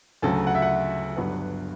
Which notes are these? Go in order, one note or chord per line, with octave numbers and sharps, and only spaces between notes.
D2 C#3 F#3 A4
F#5
E5
F#5
G1 G2 F#3 B3